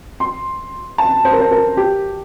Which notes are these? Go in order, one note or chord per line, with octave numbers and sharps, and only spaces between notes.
C6
A5
C5
A#4
C5
A#4
G4